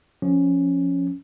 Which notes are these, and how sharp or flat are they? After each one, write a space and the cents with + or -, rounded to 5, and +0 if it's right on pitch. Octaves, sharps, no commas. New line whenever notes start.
F3 +5 C#4 +0